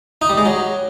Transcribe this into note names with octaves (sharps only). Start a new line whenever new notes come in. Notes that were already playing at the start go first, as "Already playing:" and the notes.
D#4
G3
G#3
F#3